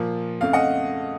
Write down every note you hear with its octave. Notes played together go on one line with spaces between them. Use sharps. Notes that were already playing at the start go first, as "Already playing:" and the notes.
Already playing: A#2 F3 A#3
F2 C#3 A3 F5
D#5 F#5